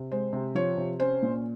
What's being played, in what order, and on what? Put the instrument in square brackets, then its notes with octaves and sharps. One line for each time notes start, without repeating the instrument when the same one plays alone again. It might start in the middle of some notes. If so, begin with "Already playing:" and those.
Already playing: [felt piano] C3
G#3 C5
C3
F3 C#5
C3
C#4 C5
A#2